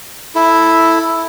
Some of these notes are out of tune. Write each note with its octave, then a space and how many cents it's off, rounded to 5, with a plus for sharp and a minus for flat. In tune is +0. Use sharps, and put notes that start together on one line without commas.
E4 +0 A4 +0